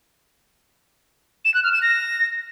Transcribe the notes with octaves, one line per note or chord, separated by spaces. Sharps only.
E7
F#6
F6
E7
A#6